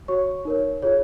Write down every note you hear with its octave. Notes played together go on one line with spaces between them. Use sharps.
F#4 C#5 C#6
D#4 A#4 C#5
F4 G#4 C#5